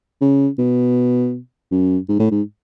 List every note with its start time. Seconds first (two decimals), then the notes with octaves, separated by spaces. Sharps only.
0.21 C#3
0.58 B2
1.71 F#2
2.09 G#2
2.19 A2
2.31 G#2